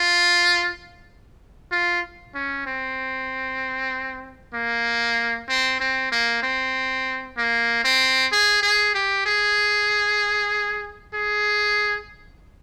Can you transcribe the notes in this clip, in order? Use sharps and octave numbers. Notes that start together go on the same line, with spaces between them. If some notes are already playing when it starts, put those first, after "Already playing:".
Already playing: F4
F4
C#4
C4
A#3
C4
C4
A#3
C4
A#3
C4
G#4
G#4
G4
G#4
G#4